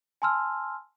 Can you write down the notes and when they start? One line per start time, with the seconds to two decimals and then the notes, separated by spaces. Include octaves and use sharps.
0.22 G#5 A5 C6 E6 F6